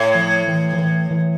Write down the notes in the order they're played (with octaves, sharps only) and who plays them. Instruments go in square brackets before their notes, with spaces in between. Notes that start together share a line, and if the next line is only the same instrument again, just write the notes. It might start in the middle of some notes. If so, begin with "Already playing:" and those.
Already playing: [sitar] A2
[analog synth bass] F3
E3
F3
E3
E3